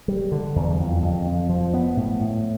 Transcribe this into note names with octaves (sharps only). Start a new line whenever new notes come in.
G3
D3
E2
F2
F2
F2
F3
B3
A2
A2